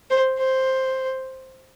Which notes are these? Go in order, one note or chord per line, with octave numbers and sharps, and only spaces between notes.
C5
C5